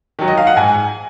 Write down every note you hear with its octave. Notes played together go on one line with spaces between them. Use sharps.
D#3 F#3
D#5
F5
F#5
G#2 G#5